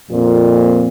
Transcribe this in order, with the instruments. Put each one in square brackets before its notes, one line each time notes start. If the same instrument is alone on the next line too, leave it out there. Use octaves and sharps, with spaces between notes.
[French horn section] F2 A#2 C4